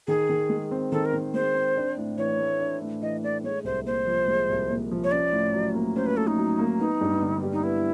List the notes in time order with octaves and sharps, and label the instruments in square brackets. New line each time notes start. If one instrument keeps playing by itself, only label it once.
[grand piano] D#3 [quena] G#4
[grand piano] D#3
G#3
C4
[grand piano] D#3 [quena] A4
[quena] A#4
[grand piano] D#3
[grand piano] G#3 [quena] C5
[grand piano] C4
D4
A2
[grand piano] E3 [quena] C#5
[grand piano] A3
D4
A2
[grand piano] E3 [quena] D#5
[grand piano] A3 [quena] D5
[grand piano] G#3 [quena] C#5
[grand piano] C2 [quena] C5
[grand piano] A#2 [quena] C5
[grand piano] F3
G#3
C2
A#2
F3
[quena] C#5
[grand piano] C#4 [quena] D5
[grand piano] A2
F#3
A#3
[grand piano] C#4 [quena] C5
[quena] B4
[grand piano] A2 [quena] A4
[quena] D#4
[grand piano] F#3
A#3
[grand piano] B3 [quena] D#4
[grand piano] G2
D3
G3
[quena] D#4
[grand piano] B3 [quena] E4